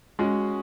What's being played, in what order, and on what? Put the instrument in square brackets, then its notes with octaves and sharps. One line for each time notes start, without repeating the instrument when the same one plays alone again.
[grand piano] G#3 C#4 F#4